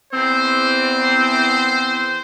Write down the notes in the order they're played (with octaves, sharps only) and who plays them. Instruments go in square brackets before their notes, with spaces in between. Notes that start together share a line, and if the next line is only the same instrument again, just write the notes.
[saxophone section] E2 C4 [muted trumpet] C5